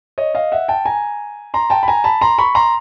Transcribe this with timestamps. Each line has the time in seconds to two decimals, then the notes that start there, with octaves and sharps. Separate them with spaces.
0.18 C#5 D#5
0.35 D#5 F5
0.52 E5 F#5
0.68 G5 A5
0.85 G#5 A#5
1.54 A#5 C6
1.70 G5 A5
1.83 B5
1.88 G#5 A#5
2.04 A5 B5
2.21 A#5 C6
2.38 B5 C#6
2.55 A#5 C6